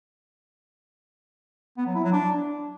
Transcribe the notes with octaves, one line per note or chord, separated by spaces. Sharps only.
B3
F#3
E4
F#3
D4